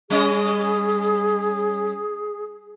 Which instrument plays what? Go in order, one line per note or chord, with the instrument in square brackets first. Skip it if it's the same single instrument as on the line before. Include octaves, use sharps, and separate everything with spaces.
[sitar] G3 C#4 D#5 [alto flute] G#4